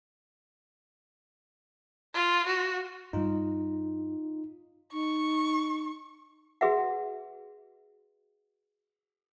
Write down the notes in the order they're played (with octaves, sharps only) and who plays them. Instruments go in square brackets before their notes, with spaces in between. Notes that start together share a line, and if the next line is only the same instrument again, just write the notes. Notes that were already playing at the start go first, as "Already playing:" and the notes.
[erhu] F4
F#4
[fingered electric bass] G2 G3 [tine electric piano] D#4 F4
[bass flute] D#4 [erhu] C#6
[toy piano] F#4 G#4 B4 E5 F#5